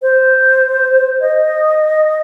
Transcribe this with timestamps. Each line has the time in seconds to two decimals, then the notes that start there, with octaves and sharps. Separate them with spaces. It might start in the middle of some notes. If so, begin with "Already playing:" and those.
0.02 C5
1.21 D#5